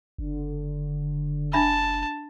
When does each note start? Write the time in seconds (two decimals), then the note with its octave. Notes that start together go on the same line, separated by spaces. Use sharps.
0.18 F#1 D3
1.53 D4 E5 A5 B5